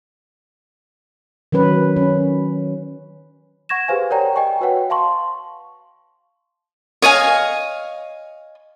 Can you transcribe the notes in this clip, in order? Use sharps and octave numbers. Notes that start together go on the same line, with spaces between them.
D#3 F#3 C#4 B4
C#4
F#5 C#6 G#6 A#6 E7
G4 G#4 B4 C5 F5 G#5
A#4 C#5 D5 F#5 G5 A#5
D#5 G5 G#5 C#6
F#4 B4 C#5 F#5 G5
F5 A5 C6 C#6
C#5 D#5 F5 G#5